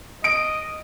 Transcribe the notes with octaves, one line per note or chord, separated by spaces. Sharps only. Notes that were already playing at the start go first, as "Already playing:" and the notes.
D#5 D7